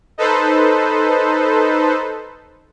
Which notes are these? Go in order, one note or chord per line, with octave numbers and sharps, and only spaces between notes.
D#4 A4 B4 C5